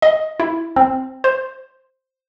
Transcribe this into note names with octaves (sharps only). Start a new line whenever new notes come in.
D#5
E4
C4
C5